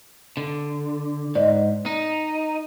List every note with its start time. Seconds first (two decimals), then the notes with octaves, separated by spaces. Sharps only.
0.37 D3
1.35 G#2 D5 D#5
1.86 D#4